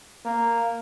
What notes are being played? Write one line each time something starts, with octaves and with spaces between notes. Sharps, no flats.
A#3